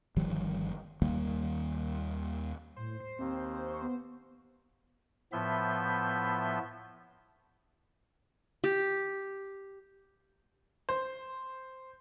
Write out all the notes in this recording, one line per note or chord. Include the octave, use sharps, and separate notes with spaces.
G1 D#3 F3 G3
D#2 D#3 G3 A#3
A2 C5
C7
D#2 C4
C#6
B3
A2 F3 B3 E5 G6
G4
C5